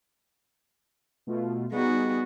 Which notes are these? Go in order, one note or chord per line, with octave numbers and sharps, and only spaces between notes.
B2 A3 F4
G3 B3 D#4 F#4 G#4